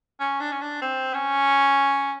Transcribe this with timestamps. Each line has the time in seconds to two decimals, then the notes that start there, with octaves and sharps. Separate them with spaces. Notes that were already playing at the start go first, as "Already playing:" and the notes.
0.20 C#4
0.40 D4
0.52 C#4
0.62 D4
0.82 C4
1.14 C#4